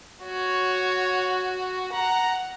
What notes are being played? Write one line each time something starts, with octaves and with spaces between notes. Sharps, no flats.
F#4 C#5
F#5 A#5